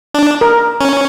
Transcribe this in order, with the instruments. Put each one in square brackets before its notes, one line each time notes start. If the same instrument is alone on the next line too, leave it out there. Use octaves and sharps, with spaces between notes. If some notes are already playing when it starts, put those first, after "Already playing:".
[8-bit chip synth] D4
[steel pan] A#4
[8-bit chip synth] C#4